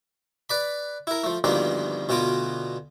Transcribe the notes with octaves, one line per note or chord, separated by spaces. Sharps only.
B4 D5 B5
E4 A#4
F3 A3
D2 G2 D#3 F3 A#3 B3
D2 B2 B3 F4 D6